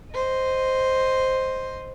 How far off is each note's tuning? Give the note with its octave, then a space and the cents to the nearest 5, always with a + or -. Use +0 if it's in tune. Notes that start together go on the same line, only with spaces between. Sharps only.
C5 +0 D#5 +0